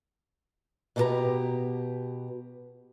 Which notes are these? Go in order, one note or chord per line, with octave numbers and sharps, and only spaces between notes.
B2 D#4 G4 A#4 B4 A#5